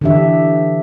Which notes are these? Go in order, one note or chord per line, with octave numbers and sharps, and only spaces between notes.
D3 E3 D4 G4 E5